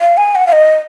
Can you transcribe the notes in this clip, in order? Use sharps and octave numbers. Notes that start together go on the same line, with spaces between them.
F5
G#5
F#5
F5
D#5